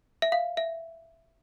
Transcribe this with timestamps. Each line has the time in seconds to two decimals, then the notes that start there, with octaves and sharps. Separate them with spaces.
0.22 E5
0.32 F5
0.57 E5